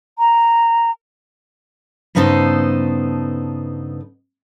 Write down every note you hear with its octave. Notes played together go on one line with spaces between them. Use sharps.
A#5
G2 C#3 B3 D#4 A4 C5